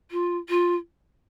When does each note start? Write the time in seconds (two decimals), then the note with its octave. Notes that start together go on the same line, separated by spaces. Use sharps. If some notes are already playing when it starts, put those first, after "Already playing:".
0.11 F4
0.48 F4